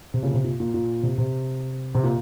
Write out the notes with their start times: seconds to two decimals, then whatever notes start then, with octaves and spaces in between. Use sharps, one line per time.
0.14 C3
0.23 A#2 C#3
0.34 C3
0.44 A#2
0.60 A#2
0.74 A#2
1.03 C3
1.18 C3
1.95 C3
2.04 A#2